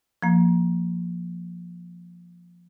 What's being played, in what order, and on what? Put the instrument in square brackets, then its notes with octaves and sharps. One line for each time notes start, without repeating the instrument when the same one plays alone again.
[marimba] F3 A#3